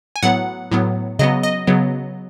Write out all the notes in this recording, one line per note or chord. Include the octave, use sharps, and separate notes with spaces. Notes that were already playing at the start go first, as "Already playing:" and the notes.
G#5
A2 F#3 B3 F#5
A2 F#3 B3
C#3 F#3 B3 D#5
D#5
C#3 F#3 B3